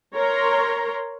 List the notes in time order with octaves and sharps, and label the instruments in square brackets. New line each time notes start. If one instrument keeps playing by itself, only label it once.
[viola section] A#4 C#5 A#5 C6